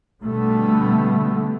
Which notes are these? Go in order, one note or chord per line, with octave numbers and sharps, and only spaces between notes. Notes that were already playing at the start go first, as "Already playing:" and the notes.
B2 D3 G3 A3 B3